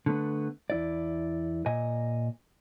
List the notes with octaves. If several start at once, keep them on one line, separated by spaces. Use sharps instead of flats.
D3 A3 B3
E2 E4 D5
A#2 D#5 G#5